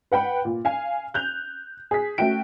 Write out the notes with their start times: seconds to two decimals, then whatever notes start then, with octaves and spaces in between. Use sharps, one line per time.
0.12 B4 F#5 G5 B5
0.45 A#2
0.65 F5 G#5
1.14 F#6 G6 F7
1.91 G#4 B6
2.18 A3 C#4 F#4 G5 D7